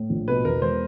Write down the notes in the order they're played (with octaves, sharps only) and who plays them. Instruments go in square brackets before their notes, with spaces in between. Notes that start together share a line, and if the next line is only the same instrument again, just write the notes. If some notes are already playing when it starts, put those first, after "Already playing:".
Already playing: [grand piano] A2
A#1
[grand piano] B2 [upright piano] B4
[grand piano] E2 [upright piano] A#4
[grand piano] E1 [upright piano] C5